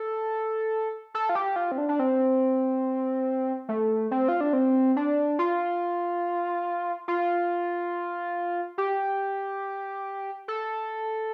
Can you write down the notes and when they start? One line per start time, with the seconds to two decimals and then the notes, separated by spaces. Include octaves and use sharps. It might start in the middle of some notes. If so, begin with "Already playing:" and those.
Already playing: A4
1.14 A4
1.29 F4
1.35 G4
1.56 F4
1.72 C4
1.78 D4
1.89 D4
1.99 C4
3.69 A3
4.11 C4
4.28 F4
4.41 D4
4.53 C4
4.96 D4
5.39 F4
7.08 F4
8.78 G4
10.48 A4